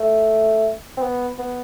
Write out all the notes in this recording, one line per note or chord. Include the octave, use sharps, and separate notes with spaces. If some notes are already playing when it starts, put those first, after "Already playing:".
Already playing: A3
C4
B3
B3